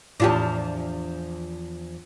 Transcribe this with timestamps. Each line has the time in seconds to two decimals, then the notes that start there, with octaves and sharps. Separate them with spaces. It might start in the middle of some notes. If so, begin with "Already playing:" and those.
0.20 E2 A2 F3 D4 F4 G4